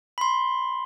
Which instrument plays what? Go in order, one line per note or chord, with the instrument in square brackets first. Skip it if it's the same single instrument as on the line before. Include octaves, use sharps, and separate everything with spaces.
[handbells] B5 C6